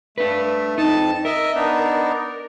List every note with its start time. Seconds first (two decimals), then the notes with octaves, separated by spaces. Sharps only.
0.18 A3 D4 B4
0.78 F2 D#4 A5
1.25 A#4 D#5 E5
1.55 B3 D4 D#4